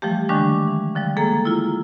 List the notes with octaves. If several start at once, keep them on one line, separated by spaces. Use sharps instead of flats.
E3 F3 G3 A3 G4
D3 D#3 G3 G#3 D4 C#6
E3
D3 F3 G3
G#3 A#3 G#4 A4 A#5
E4 F4